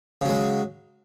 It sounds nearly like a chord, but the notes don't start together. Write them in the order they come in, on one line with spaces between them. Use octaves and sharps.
C#3 F#3 G#3